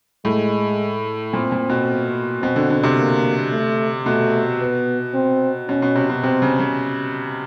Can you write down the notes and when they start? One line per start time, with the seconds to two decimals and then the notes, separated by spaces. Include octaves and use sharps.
0.25 A2 G#3
1.33 A#2 C4
1.52 A#2
1.69 B2
2.42 B2 C4
2.56 D3
2.70 D3
2.83 C3
2.97 A#3
3.51 A3
4.05 B2 A3
4.60 B3
5.14 C4
5.68 B2 C#4
5.82 B2
5.95 C3
6.09 B2
6.23 C3 C4
6.42 C#3
6.60 C#3